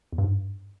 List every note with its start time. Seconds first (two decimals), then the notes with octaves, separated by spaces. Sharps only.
0.12 E2
0.18 G2
0.24 G#2